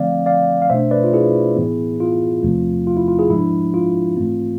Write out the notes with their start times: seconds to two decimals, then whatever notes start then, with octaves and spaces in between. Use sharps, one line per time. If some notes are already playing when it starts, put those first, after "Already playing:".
Already playing: D3 F3 A3 C4 D5 F5
0.26 D5 F5
0.62 F5
0.70 B2 A3 D4 C5 E5
0.91 B4 D5
1.04 F4
1.13 E4 G#4
1.56 A2 E3 B3
2.00 F4
2.43 E2 C3 F3 A3 C4
2.87 F4
2.97 E4
3.08 F4
3.19 E4 G#4
3.30 G#2 F3 G#3 D4 E4
3.74 F4
4.16 G#2 E3 A3 C4